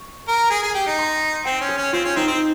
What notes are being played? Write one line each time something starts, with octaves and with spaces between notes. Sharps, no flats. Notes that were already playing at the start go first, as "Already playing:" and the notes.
Already playing: C#6
A#4
G#4
G#4
G4
D#4
C6
C4 G5
C#4
G#4
C#4
C4 F4
C#4
C4 D#4
C4